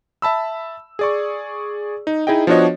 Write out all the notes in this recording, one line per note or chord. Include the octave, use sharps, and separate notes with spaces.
E5 A5 B5 E6
G#4 D5 C#6
D#4
D#4 E4 G#4 D#5 G5
F3 B3 D4 F#4 C#5 D#5